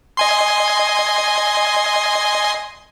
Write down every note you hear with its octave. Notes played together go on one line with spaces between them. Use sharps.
D#5 G#5 C6